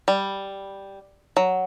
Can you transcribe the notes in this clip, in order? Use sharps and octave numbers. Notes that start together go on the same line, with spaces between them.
G3
F#3